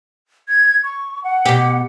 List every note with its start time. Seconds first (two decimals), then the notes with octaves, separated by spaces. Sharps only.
0.49 G#6
0.84 C#6
1.24 F#5
1.45 B2 G4